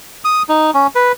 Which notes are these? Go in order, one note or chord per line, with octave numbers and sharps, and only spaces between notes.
D#6
D#4
C#4
B4